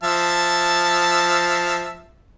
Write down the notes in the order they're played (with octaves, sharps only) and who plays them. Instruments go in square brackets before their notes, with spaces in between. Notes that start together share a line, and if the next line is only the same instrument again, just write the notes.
[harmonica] F3 E5 A5